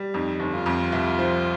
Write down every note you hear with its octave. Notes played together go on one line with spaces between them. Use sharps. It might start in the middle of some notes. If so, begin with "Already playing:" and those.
Already playing: G3
F2 D#4
G1
F4
F2
C2
F3